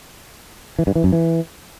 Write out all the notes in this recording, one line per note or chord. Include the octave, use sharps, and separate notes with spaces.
E3
G2
E3
F#2
E3